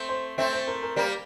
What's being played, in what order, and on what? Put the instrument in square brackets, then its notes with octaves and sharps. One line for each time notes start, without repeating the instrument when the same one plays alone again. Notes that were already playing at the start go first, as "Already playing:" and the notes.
Already playing: [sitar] A3 C4
[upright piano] C5
[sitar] A3 C4 [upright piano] E5
[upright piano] C5
A#4
A#4
[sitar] G3 A#3 [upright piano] D5